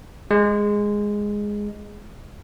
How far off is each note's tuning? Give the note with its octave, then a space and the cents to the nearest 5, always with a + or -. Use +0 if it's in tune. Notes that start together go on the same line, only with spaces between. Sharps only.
G#3 -5